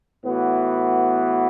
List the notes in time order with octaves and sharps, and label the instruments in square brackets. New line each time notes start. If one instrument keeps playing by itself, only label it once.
[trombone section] A2 E3 B3 F#4